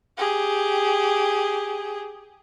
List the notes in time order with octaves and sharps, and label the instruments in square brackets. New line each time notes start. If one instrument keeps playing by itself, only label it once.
[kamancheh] G4 G#4